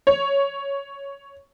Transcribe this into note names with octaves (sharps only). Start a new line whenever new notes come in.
C#5